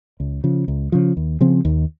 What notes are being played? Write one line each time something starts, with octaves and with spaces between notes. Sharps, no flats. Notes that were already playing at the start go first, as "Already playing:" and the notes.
C#2
C#3 F3
C#2
C#3 F3
D#2
C#3 F3 C4
D#2